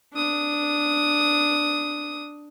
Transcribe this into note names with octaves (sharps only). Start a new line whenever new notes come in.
D4 D#6